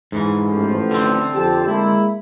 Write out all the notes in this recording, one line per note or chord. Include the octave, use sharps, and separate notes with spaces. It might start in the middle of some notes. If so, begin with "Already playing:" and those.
G#2 E3
A1 A2 F3
D3 C4
F2 G4 A5
G#3 A#3 E4